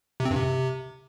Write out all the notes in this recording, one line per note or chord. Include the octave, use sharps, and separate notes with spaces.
C3
C4
G2
C3